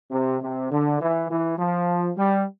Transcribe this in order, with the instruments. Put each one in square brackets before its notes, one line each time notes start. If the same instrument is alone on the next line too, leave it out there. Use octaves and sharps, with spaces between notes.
[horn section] C3
C3
D3
E3
E3
F3
G3